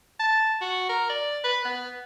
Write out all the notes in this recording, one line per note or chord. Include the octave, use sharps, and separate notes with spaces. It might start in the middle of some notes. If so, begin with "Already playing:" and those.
A5
F#4
A#4
D5
B4
B3